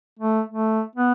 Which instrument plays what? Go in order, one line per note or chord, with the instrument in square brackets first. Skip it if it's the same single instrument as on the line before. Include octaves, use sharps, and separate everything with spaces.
[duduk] A3
A3
B3